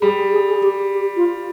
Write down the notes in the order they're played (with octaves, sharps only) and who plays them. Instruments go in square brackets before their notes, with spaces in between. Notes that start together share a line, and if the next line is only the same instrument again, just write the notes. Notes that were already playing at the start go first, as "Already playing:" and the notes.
[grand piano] G3 [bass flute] G#4
[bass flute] G#4
G#4
G4
G4
F4